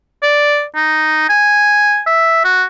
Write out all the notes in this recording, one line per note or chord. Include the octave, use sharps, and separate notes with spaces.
D5
D#4
G#5
E5
F#4